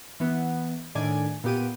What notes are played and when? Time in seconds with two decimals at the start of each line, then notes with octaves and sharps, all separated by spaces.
0.20 E3 B3
0.95 A2 D#3 D4 D5 G#5
1.44 A#2 B3 G4 D#7